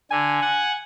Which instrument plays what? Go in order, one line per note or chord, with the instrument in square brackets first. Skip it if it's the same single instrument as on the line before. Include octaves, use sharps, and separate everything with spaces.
[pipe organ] D3 [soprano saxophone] G#5
[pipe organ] F#5